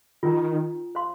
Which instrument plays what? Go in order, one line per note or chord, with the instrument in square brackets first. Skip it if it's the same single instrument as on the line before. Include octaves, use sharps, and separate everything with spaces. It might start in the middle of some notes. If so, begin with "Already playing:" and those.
[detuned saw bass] D#3 [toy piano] F4 A#4 G5 A#5
[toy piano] C5 F5 C6